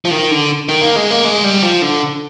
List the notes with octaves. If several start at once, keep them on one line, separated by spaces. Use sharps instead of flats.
F3
D#3
D3
D#3
A#3
G#3
A#3
G#3
G3
F3
D3